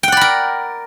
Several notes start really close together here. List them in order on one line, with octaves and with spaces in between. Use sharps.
G5 F#5 D5 B5 A#4